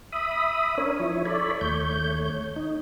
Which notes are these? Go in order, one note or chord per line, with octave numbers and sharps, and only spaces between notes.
E5 B5 D#6
C#4 D4 A#4 C#5
F3 E4 C#5
A4 C#5 D5 B5
D#2 A3 C#5 G6
D#4